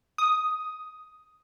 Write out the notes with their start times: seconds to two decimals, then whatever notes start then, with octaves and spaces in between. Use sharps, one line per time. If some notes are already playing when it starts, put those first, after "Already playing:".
0.18 D#6